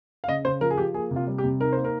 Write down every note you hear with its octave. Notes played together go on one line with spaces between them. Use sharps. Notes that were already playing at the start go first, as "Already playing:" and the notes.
F5
C#3 D#5
C#3 C5
F3 A#4
G#4
F3 G4
A#3 G#4
C3 F4
G3
G4
C3
D#4 A#4
A#3 C5
A#4